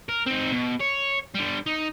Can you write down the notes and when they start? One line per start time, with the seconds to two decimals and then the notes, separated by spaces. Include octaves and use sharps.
0.09 A#4
0.27 C4 D#4
0.52 B2
0.81 C#5
1.35 D3 G3
1.66 D#4